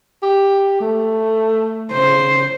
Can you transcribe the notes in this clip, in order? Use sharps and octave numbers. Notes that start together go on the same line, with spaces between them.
G4
A3
C#3 C5